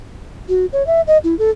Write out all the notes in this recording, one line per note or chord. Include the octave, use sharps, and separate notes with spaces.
F#4
C#5
E5
D#5
E4
A4